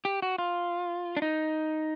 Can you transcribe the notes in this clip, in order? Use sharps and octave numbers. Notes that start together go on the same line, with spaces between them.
G4
F#4
F4
D4
D#4